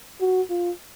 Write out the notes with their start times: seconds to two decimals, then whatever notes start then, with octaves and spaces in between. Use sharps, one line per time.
0.20 F#4
0.50 F4